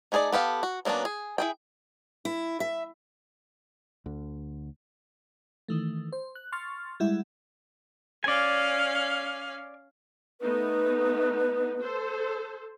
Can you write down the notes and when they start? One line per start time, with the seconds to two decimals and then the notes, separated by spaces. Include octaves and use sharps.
0.12 A3 D#4 G#4 A#4 D5
0.32 B3 G4 A4 F5
0.63 F#4
0.85 F#3 A#3 B3 C#4 D4
1.05 G#4
1.38 E4 G#4 G5
2.25 E4
2.60 E5
4.06 D2 D3
5.68 D#3 E3 A3
6.12 C5
6.35 F#6
6.52 C6 C#6 F6 A6
7.00 G3 G#3 E4 E5 F#5
8.24 C#4 D5 F5 G#5
10.41 A3 B3 D#4 B4
11.82 A4 C5